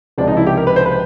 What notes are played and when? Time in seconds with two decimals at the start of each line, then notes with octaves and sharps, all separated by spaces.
0.18 C#2 C3 F3 G#3 D4
0.27 D#4
0.37 E4
0.47 G4
0.57 A#4
0.67 B4
0.76 C5
0.86 B4